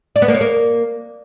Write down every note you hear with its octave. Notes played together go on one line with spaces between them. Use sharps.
D5
B3
A#3
C#5
A#3